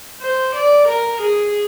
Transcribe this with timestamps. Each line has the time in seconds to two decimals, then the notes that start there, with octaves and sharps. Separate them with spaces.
0.22 C5
0.55 D5
0.88 A#4
1.21 G#4